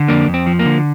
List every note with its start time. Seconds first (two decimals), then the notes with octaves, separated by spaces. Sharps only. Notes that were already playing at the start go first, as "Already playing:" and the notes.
Already playing: D3
0.08 F2 A#3 D4
0.28 F2
0.34 C4
0.47 F3
0.59 A#3
0.65 D3